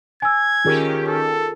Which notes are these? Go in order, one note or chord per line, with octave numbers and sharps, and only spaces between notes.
G#5 E6 G#6
D#3 C#4 F4 G4 G#4 A#4
A4